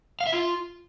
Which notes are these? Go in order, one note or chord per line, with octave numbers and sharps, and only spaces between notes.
F5
E5
F4